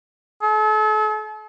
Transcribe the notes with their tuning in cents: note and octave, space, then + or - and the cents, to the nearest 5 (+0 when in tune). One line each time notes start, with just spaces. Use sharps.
A4 -40